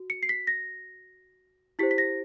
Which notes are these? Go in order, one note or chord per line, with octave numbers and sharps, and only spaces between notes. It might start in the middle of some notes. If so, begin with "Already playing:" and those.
Already playing: F#4
C#7
C7
B6
A#6
E4 G4 C5 B6
B6
A#6